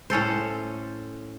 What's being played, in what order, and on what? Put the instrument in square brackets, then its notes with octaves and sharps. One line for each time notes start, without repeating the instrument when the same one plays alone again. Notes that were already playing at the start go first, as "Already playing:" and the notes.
[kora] A2 C#4 A4 C5